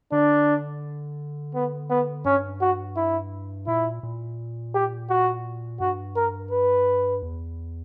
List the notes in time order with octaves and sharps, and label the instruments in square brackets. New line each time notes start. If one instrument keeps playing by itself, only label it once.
[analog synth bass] D3 [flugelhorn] D4
[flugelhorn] B3
B3
[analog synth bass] G2 [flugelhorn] C#4
[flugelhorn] F#4
E4
[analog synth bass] A#2 [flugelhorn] E4
[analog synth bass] A#2
[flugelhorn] G4
F#4
[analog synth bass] G2 [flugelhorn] F#4
[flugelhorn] A#4
B4
[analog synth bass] E2